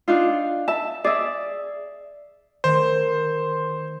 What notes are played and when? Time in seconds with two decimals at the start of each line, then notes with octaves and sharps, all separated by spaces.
0.08 D4 D#4 F4
0.68 E5 A5
1.04 G#4 D5 E5
2.64 D#3 A3 C5